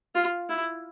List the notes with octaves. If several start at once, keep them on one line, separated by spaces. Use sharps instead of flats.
F4
E4